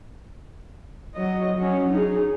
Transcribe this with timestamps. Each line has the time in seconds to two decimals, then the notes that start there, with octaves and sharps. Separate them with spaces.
1.15 F#3 D#5
1.58 F#3 C#4
1.90 D#4 G#4